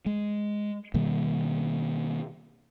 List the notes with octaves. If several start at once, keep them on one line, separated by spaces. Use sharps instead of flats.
G#3
B2 D#3 G3 A#3